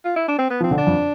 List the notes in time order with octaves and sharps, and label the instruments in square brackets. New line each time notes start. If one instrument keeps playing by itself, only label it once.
[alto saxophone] F4
E4
D4
C4
B3
[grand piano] F3
[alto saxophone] C4
[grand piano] D3
[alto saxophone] D4
[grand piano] F2